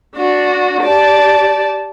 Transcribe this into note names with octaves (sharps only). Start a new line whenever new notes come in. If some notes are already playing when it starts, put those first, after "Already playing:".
D4 F#4
G4 D5 A5